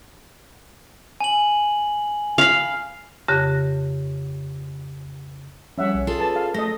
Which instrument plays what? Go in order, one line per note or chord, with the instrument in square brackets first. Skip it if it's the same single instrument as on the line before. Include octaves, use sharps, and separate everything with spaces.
[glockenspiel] G#5 F#7
[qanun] F5 B5
[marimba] F2 C#3 G4 F#6 A#6
[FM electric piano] F3 G3 [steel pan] C#4 E5 F#5
[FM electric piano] B1
[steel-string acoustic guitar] F4 G#4 A4
[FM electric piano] B4 [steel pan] A5
[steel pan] F5
[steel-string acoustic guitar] A3 [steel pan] A4 D#5 [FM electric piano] A#6